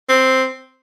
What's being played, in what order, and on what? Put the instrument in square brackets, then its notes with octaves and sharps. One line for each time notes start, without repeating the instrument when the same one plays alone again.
[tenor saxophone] C4